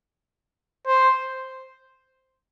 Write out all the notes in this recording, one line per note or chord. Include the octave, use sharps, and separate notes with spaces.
C5